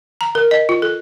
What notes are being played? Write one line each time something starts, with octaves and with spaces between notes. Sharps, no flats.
A#5
A#4
D#5
F4
A4